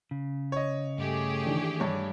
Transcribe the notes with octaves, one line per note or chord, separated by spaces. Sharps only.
C#3
C#5 D#5
G2 A3 G4 G#4
D#3 E3 D4
G2 C#5